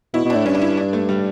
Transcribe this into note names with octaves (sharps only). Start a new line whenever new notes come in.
B2 E4
B2
A2 D4
G2 C#4
D4
E4
D4
A3
G3